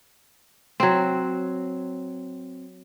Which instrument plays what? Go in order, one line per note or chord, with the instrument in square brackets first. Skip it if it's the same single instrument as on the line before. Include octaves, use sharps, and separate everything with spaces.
[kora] F#3 C4